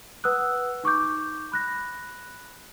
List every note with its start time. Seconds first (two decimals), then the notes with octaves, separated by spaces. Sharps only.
0.24 B4 F#5 D#6 E6 F#6
0.84 D#4 C#6 D6 G6
1.52 B5 F#6 A#6